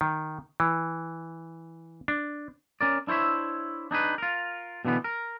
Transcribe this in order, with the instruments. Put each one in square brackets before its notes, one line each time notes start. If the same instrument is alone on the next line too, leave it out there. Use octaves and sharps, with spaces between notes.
[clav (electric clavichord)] D#3
E3
D4
[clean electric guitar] C#4 A#4 D5
D4 E4 C5 C#5 E5
D4 D#4 G#4 B4
F4 A#4
B2 D3 E3 B3
A#4